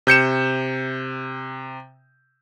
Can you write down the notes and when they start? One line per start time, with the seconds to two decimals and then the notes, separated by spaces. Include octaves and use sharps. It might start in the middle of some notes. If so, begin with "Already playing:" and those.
0.07 C3 G6 C#7 E7